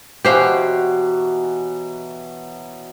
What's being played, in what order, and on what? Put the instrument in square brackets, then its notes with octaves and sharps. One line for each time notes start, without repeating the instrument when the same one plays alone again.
[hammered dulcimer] B2 E3 F#3 [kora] G4 C5 F5